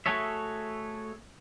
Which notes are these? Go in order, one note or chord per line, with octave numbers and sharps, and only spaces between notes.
A3 F#4 G#4 A4 C#5 E5